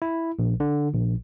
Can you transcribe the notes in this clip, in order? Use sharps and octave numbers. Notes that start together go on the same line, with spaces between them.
E4
A#1
D3
A#1